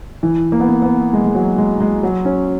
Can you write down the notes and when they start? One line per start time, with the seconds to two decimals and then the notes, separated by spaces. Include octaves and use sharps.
0.23 E3
0.52 A#3
0.60 B3
0.68 A#3
0.82 B3
1.13 G#3
1.24 G#3
1.35 F#3
1.58 G#3
1.80 G#3
2.03 F#3
2.25 C#4